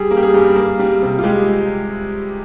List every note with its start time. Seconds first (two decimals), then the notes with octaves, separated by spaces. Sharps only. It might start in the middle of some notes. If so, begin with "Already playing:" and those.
Already playing: G3 G#4
0.11 A#3
0.17 G4
0.23 G#4
0.34 G2
0.56 A#3
0.79 G3
1.02 C3
1.19 F4
1.24 G#3 G4